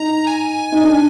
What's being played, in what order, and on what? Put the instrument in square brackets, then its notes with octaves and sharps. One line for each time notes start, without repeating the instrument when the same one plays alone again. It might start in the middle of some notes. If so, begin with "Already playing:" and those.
Already playing: [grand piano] D#4 [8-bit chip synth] A#5
[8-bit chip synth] G#5
[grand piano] D#4
D4